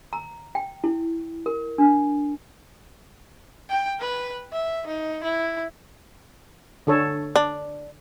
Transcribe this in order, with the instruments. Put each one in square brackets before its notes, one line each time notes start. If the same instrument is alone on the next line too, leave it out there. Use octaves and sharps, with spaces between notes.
[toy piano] A#5
G5
E4
A#4
D4
[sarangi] G5
B4
E5
D#4
E4
[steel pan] D3 A4 C#5
[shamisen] D4